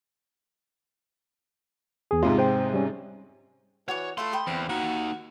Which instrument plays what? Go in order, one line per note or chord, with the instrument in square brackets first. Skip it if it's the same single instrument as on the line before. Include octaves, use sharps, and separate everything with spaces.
[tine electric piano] E2 G#4
[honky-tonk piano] G#2 C3 G#3 [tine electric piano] F4
[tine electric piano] C5 G5
G3 C#4
[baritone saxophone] E3 [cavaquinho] F#4 D5 F#5 [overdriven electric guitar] C#5
[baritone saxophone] A3 [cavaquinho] F4 A4 B4 [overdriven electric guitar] C6
[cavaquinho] G5 B5 D#6
[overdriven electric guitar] E2 [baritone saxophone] C4
[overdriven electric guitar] A#3 D#4 [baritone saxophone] F#4